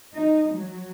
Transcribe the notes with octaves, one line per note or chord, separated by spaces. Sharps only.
D#4
F#3